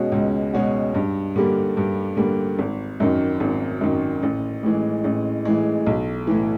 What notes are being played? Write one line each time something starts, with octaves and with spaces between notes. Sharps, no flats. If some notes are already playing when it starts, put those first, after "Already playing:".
Already playing: B2 G#3 C#4 F#4
C#2
B2 G#3 C#4 F#4
G2
D3 G3 A#3
G2
D3 G3 A#3
G#1
F#2 D#3
G#1
F#2 D#3
A1
A2 E3 G#3
A1
A2 E3 G#3
B1
A2 E3